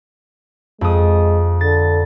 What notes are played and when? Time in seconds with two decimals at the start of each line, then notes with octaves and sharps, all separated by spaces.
0.81 F2 G#3 D#6
1.61 D3 A6